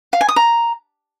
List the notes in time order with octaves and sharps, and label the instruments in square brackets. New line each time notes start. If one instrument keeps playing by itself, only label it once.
[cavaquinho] F5
G#5
D#6
A#5